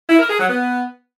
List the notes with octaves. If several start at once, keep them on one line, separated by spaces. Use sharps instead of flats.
E4
A#4
G#4
F#3
B3